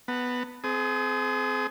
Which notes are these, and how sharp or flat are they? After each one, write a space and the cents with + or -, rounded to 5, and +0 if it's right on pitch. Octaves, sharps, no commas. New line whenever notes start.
B3 +0 F#5 +0 A5 +45
C4 -25 G#4 +35 D#6 +0